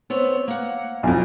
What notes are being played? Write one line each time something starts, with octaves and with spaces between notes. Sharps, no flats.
B3 C4 C#5
A#3 F#5
B1 F2